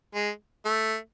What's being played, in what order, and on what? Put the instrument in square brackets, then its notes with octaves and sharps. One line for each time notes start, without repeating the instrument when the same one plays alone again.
[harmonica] G#3
A3